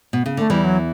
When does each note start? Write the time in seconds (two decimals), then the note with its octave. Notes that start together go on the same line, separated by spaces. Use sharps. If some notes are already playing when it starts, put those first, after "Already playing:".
0.13 B2
0.26 C#3
0.37 D3 A3
0.50 E2 E3 G3
0.64 F#3